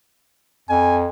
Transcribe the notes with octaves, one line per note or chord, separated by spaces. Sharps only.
F2 G#5